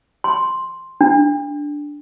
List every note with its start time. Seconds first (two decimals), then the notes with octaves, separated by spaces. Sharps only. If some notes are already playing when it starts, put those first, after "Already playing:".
0.24 C6
1.01 D4